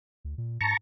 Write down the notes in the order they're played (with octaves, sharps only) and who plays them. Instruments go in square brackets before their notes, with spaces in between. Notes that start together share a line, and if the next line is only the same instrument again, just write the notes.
[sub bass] D2
A#2
[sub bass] G#2 [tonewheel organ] A5 A#5 C#6